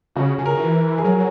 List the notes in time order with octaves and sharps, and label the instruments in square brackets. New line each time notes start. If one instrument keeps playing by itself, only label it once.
[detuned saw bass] C#3 [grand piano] F#4
[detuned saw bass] C#3 [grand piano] G#4
[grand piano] A#4
[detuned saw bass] D#3
E3
[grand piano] G#4
[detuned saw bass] F#3 [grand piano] A#4